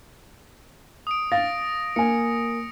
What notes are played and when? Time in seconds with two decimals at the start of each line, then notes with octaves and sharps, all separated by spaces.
1.07 D#6 D7
1.32 F5 A6 A#6
1.96 A#3 G#5 C#7